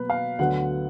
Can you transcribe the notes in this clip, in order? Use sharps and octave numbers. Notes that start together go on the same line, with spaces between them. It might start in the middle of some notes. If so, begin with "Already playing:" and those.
Already playing: B2 F#3 A#3 B4
F5
D2 D3 F#3 B3 F#5